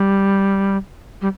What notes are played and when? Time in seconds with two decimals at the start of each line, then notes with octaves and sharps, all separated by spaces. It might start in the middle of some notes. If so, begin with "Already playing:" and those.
Already playing: G3
1.21 G3